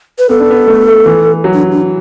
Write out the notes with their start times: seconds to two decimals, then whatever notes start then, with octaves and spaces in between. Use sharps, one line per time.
0.19 B4
0.29 B3 A4
0.40 D4
0.51 B3
0.68 A3
1.06 E3
1.44 F#3
1.53 D4
1.73 D4